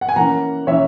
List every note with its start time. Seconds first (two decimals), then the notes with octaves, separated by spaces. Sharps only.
0.01 F#5
0.09 G#5
0.16 E3 A#3 C#4 F#5 A#5
0.67 E3 A#3 C#4 C#5 E5